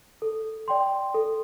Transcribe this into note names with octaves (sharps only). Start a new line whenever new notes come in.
A4
D5 G5 C6
A4